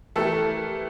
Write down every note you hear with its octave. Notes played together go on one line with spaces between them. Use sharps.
E3 A3 E4 G4 A4 A#4